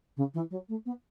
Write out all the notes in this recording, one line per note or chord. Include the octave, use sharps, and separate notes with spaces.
C#3
E3
F#3
A3
B3